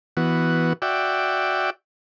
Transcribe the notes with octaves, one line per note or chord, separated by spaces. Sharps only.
E3 B3 F#4
F#4 D5 E5 G5